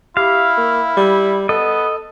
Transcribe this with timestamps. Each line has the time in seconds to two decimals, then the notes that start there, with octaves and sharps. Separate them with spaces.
0.17 E4 G4 F5
0.58 A#3
0.97 G3
1.49 B3 A4 D#5